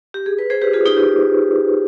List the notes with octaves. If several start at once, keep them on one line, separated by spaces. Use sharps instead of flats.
G4
G#4
B4
G#4 C5
G4 B4
F4 G#4
D#4 G4
D#4 G4